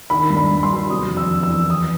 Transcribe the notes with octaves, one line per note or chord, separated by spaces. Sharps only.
D#3 B5
G2
B5
G2
C6
F#3
C3 D#6
F2
E6
F2
E6
E3
E3 D#6